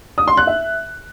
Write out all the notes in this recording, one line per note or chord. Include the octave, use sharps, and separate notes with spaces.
D#6
C6
F#6
E5